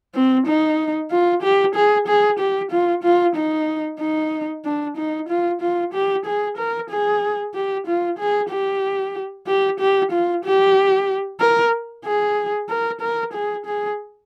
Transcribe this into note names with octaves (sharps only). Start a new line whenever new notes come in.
C4
D#4
F4
G4
G#4
G#4
G4
F4
F4
D#4
D#4
D4
D#4
F4
F4
G4
G#4
A#4
G#4
G4
F4
G#4
G4
G4
G4
F4
G4
A#4
G#4
A#4
A#4
G#4
G#4